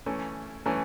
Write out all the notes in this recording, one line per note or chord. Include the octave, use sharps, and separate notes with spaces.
E3 A3 C#4
E3 A3 C#4